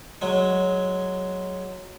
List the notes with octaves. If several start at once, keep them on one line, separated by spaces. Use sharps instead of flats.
F#3 G#3